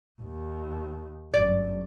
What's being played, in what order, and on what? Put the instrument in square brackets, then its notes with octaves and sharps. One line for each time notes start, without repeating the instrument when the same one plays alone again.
[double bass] D#2
[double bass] G1 F#2 [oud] D5